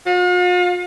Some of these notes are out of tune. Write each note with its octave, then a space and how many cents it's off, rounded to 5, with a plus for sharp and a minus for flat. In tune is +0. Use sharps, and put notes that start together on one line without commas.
F4 +45